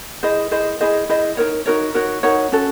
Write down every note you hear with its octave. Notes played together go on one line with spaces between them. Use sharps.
E4 G#4 C5 D#5
E4 G#4 C5 D#5
E4 G#4 C5 D#5
E4 G#4 C5 D#5
D#4 F#4 A#4 C#5
D#4 F#4 A#4 C#5
D#4 F#4 A#4 C#5
D#4 F#4 A#4 C#5
C#4 F#4 A4